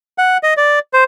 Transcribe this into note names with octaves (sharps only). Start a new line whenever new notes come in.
F#5
D#5
D5
C5